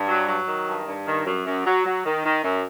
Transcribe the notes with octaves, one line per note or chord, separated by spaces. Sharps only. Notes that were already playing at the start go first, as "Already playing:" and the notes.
Already playing: G2
F#3
F#3
D#3
G2
G2
D#3
F#2
F#2
F#3
F#3
D#3
D#3
F#2